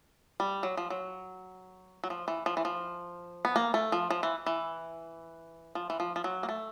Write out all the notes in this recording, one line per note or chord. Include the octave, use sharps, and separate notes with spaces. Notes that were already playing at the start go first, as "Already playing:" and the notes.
G3
F#3
F3
F#3
F#3
F3
E3
F3
E3
F3
B3
A#3
A3
F3
F3
E3
E3
F3
E3
F3
F3
F#3
A#3
A3